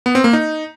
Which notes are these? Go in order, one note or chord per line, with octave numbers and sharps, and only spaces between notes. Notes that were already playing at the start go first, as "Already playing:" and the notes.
B3
C4
A#3
D#4